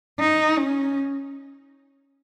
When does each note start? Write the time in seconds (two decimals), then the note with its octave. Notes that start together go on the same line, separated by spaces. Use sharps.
0.19 D#4
0.57 C#4